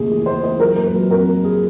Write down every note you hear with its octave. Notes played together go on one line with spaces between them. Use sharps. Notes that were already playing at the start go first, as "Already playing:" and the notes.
Already playing: D#2 C#3 A3 G#4
E3
D#2 C5
E3 C5
F#3 A#4
A#3 A#4
B4
F#3
F2 A#4
A#3
G#4